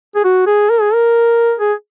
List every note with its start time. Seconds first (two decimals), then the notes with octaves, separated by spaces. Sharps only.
0.16 G#4
0.25 F#4
0.47 G#4
0.70 A#4
0.81 G#4
0.94 A#4
1.60 G#4